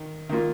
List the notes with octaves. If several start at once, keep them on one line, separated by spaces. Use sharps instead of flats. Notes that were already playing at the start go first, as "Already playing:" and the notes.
Already playing: D#3
D#3 A#3 F4